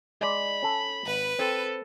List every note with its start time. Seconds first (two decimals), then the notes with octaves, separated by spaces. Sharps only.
0.21 G#3 D5 B5
0.62 C#4 A4
1.06 G#1 B4
1.39 C4 A4